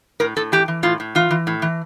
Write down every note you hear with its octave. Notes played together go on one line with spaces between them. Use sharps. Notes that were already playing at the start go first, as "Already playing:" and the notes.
A2 A#4
A2 A4
E3 G4
E3
A2 F4
A2
E3 F4
E3
A2
E3